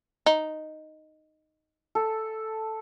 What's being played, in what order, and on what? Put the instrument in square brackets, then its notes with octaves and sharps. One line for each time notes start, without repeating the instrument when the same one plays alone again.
[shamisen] D#4
[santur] A4